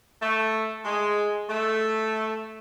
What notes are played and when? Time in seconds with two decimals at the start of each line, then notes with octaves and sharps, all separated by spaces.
0.21 A3
0.85 G#3
1.49 A3